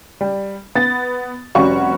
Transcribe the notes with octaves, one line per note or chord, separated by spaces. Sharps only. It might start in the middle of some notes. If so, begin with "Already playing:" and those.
G3
B3 A6
F1 G3 C#4 F#4 C#6